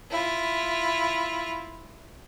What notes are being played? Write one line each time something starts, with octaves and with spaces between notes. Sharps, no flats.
E4 F4